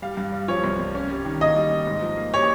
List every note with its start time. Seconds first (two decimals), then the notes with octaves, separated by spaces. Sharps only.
0.02 G3 F5
0.17 G2
0.32 G3
0.48 F3 C#5
0.64 C2
0.79 C2
0.95 C#4
1.10 G3
1.25 D#3
1.41 A#3 D#5
1.56 G3
1.71 G3
1.87 G#2
2.02 F3
2.17 A#3
2.33 G4 C#5